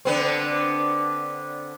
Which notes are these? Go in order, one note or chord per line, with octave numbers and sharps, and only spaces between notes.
D3 B3 C4